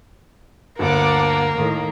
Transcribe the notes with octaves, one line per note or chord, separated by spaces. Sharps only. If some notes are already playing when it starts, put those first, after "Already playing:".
G1 D2 A#3 F#5 A5 D6
A2 D#3